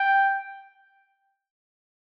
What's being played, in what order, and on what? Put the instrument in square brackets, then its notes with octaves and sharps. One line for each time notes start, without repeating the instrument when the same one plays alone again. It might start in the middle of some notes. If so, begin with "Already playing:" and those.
Already playing: [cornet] G5